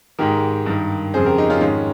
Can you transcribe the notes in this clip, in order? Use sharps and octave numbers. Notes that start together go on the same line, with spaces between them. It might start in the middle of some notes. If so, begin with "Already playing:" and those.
G#2 D#3 G4 A#4
G2 D#3
F2 C#3 G#4 C5
G4 A#4
D#4 G4
C#4 F4
G#2 D#3 C#4